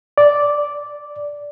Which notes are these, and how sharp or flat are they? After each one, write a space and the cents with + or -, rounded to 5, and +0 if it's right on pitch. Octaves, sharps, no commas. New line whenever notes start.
D5 -5